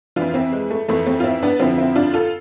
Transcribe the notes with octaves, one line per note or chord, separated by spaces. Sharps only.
F2 E3 D4 F4
C4 E4
G#3
A3
F2 E3 A3
A3 C4
F4
C4 E4
B3 D4
F2 D3 F3 C4 E4
C4 E4
D4 F4
F4 A4